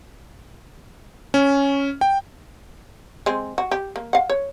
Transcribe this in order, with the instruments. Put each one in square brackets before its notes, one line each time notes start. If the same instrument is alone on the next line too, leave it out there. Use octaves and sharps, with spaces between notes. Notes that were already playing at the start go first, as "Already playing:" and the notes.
[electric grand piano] C#4
G5
[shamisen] G#3 C4
F#4
G4
A#3
F5 F#5
C#5